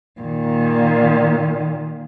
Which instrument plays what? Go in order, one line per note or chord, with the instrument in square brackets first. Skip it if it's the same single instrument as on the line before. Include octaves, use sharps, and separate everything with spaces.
[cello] A#2 D#3